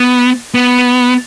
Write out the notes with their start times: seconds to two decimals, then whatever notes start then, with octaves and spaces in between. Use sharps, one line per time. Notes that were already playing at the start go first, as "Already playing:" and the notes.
Already playing: B3
0.54 B3